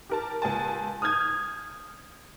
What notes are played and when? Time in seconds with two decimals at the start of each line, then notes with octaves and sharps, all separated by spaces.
0.10 G4 A#4 A5
0.42 C#2 G#5 A5
1.02 D#6 F6 G6 G#6